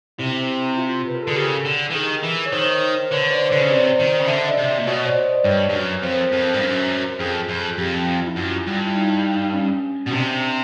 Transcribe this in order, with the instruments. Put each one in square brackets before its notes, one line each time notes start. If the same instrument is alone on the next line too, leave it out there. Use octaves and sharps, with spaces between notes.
[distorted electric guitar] C3 [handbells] E4
[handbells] F4
B4
A#4
A4
[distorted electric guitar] D3 [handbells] G#4
[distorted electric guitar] C#3 [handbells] G4
[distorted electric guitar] D3
E3
[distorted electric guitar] D#3 [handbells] G#4 A#4
[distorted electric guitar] E3
[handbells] C#5
[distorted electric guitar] D#3 [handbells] A#4 C5
[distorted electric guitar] D3 [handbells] B4 C#5
[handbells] C5 D5
[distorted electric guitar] D3 [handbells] B4 C#5
[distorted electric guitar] C#3
[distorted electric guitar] C3 [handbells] C5 D5
[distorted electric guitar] D#3
C#3
[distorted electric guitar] D3 [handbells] E5
[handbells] D#5
D5 E5
[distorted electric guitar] C3
A#2
[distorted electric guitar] B2 [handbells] C#5 D#5
[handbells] C5 D5
D#5
D5
[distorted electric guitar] G2 [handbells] B4 C#5
[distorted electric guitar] G2
F#2
[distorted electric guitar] F2 [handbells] A#4 C5
[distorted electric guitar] F2
G2
F#2
[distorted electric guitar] F2 [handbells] G#4
[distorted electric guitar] F2
[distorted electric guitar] F2 [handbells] G4
[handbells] E4
[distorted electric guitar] F#2 [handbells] F4
[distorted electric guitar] G2
[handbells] E4
D#4
C#4
[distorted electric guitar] B2
[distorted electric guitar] C3 [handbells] D4